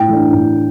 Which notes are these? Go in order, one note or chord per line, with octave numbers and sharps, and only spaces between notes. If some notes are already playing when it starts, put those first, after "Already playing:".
Already playing: A2 G5
E3 A3 D4
A2